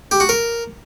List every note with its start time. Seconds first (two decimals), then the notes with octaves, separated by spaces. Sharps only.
0.11 G4
0.20 F#4
0.29 A#4